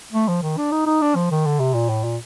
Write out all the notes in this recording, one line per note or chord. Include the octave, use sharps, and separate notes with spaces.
A3
F3
D#3
D4
D#4
D#4
D4
F3
D#3
D3
C3
A#2
A2
A#2